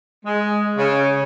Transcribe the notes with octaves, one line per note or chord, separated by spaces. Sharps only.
G#3
C#3